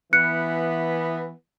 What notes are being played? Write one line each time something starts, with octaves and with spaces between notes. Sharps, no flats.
E3 B3 F#6 C#7